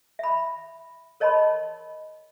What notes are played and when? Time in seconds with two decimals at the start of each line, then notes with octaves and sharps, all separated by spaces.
0.19 E5 B5
1.20 A#4 C#5 D#5 A5 B5 C6